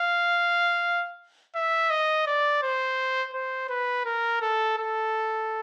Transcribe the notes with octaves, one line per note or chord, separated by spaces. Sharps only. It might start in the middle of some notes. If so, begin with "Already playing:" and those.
Already playing: F5
E5
D#5
D5
C5
C5
B4
A#4
A4
A4